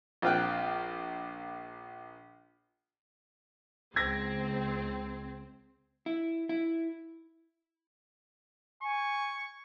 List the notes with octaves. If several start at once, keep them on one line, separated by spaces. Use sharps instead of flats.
A#1 C4 F4 F5 G5 F#6
C#2 C4 G#6 A#6
E4
E4
G#5 C#6